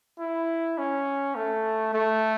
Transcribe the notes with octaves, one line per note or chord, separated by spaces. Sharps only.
E4
C#4
A3
A3